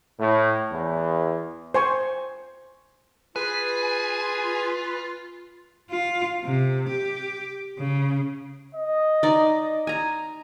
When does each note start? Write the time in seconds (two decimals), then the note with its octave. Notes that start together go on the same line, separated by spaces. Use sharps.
0.19 A2
0.71 E2
1.74 C5 G#5 C#6
3.36 F4 G#4 B4 G#5
5.91 F4
6.45 C3
6.89 G4
7.79 C#3
8.75 D#5
9.23 D#4 D5
9.87 G#5 A#5